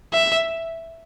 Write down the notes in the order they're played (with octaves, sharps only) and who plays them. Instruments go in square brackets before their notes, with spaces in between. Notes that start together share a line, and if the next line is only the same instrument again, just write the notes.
[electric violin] E5